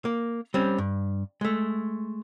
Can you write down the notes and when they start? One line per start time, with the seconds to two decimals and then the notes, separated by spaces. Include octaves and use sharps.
0.05 A#3
0.54 G3 C4 C#4
0.78 G2
1.41 G#3 A3